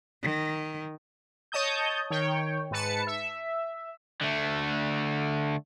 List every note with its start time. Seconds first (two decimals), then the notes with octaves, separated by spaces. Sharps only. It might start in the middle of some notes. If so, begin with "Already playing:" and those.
0.23 D#3
1.52 C#5 D#5 A5 D#6 G6
2.10 D#3 C#5 G5
2.71 G#2 B4 A5 C#7
3.07 E5
4.22 D3 A3